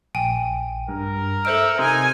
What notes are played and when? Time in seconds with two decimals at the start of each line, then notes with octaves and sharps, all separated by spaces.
0.15 A#1 G5 G#5
0.89 G2 A#4
1.45 A4 C5 E5 F6 C#7 D7
1.79 C3 D#4 G#5 C6